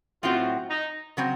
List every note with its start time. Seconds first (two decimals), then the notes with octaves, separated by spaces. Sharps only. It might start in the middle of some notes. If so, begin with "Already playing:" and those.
0.23 A2 F#3 C4 F4 F#4
0.69 D#4
1.17 C#3 F#3 C4